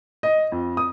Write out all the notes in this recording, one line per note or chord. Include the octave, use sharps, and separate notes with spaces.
D#5
F2
D#6